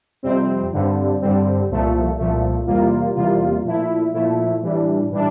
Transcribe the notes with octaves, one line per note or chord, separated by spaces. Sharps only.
F2 C3 G3 C4
G2 D3 G3 C4
G2 D3 G3 C4
C2 A#2 F3 A3
C2 A#2 F3 A3
E2 C3 G3 A#3 F4
E2 C3 G3 A#3 F4
A#2 F3 A3 E4
A#2 F3 A3 E4
A2 E3 G3 D4
A2 E3 G3 D4